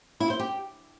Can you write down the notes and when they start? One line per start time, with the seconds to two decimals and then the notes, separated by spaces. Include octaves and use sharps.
0.20 E4
0.30 C5
0.40 G4